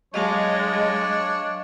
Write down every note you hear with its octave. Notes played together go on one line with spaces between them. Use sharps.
F#3 G#3 D4 C#5 D#5 F5 A5